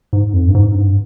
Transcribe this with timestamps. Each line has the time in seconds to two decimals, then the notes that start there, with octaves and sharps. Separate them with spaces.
0.13 G#2
0.33 F2
0.49 G2
0.55 G#2
0.75 G2